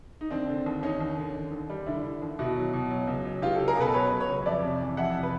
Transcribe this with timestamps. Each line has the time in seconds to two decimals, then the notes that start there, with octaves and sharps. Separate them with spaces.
0.21 D#4
0.31 D#2 C4 D4
0.49 D3
0.66 D#2
0.83 D#2 C#4 D#4
1.00 D#2
1.17 D3
1.35 D3
1.52 D#2
1.70 G3
1.86 D3 D4 E4
2.04 D3
2.22 D#2
2.39 B2 E4 F#4
2.56 F#3
2.73 B2
2.91 F#3
3.07 C#2
3.25 F#3
3.42 C#2 F4 G4
3.55 C#2 G4 A4
3.68 G#4 A#4
3.77 B2 A4 B4
3.94 F#3 B4 C#5
4.11 F#3
4.20 B4 C#5
4.29 C#2
4.46 F2 D5 E5
4.63 C3
4.81 E3
4.97 F2 E5 F#5
5.15 C3
5.23 B4